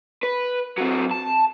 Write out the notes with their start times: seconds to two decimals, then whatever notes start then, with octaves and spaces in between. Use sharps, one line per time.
0.23 B4
0.78 F#3 C4
1.11 A5